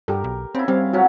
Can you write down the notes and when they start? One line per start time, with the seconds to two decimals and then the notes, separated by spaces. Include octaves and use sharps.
0.08 G2 G4 A4 A#4
0.24 B1
0.55 C#3 C4 E4
0.68 G3 C4 F5
0.93 A2 F#3 C#4 F#4